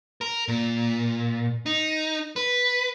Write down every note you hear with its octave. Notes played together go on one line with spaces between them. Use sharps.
A#4
A#2
D#4
B4